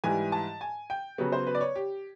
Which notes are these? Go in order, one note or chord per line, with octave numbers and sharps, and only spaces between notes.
G#2 E3 G3 G#5
A5
G#5
G5
C#3 F#3 B3 C#5
C5
B4
D5
C#5
G4